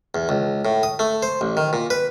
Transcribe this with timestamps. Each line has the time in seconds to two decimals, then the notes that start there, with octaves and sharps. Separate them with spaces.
0.15 E2
0.29 C#2
0.65 A2
0.83 D#6
0.99 A3
1.23 C5
1.41 A1
1.57 D#3
1.73 A#2
1.90 B4